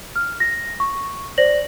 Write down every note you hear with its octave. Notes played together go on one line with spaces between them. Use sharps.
F6
A#6
C#6
C5 D5 A#6 F#7